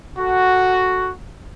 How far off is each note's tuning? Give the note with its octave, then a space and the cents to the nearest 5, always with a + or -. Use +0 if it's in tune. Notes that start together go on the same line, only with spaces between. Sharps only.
F#4 +0 A4 +10